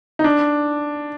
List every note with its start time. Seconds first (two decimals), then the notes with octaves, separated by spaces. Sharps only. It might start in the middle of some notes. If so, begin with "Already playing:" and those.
0.19 D#4
0.24 D4